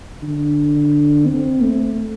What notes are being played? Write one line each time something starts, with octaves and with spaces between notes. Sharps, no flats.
D3
C4
A3